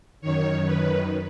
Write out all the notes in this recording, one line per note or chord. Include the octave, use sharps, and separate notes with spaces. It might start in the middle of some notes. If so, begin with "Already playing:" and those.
F#2 D#3 C#5
B4